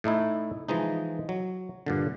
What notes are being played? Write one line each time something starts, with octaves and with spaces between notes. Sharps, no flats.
A2 A3 D#4 E4
E3 F3 G#3 D#4
F#3
G2 A#2 D3